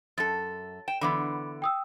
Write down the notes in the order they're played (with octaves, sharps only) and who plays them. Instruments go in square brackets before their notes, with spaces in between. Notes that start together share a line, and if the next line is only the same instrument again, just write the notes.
[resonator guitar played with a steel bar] F#2 A4 [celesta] A6
[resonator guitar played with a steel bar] G5 [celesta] E7
[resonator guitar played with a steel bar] D3 E3 B3 [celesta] B5 D6
[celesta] G5 D#6 E6